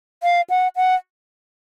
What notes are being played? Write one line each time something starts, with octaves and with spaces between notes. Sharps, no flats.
F5
F#5
F#5